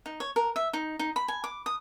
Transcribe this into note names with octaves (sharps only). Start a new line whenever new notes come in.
D#4
C#5
A#4
E5
D#4
D#4
B5
G#5
D6
D#6